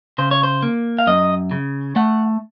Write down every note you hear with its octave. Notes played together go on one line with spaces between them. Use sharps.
C#3 C5
C#5
C5
A#3
F5
F#2 D#5
C#3
A3 F#5